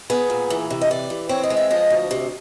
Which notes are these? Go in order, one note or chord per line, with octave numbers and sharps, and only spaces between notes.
B3 G#4
A#2
E3
C3
D#5
E3 D5
E3
C4 C#5
D#5
G#3
E5
F3 D#5
D2
C3